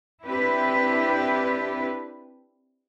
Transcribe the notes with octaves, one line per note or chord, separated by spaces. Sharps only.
C4 D4 E4 G4 B4